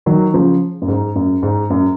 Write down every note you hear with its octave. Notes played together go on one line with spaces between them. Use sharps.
D#3 F#3
C#3 F3
F#2
G#2
F#2
G#2
F#2